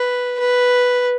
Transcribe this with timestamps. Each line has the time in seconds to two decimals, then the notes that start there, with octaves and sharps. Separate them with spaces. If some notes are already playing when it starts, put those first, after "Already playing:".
Already playing: B4
0.40 B4